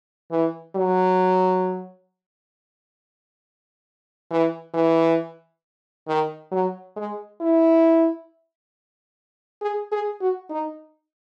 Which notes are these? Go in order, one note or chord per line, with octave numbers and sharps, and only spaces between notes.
E3
F#3
E3
E3
D#3
F#3
G#3
E4
G#4
G#4
F#4
D#4